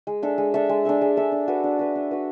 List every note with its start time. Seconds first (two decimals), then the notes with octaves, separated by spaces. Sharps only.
0.07 G#3
0.23 D4 A4 E5
0.38 G#3
0.54 D4 A4 E5
0.69 G#3
0.85 D4 A4 E5
1.01 G#3
1.17 D4 A4 E5
1.32 D4
1.48 F#4 B4
1.64 D4
1.79 F#4 B4
1.95 D4
2.11 F#4 B4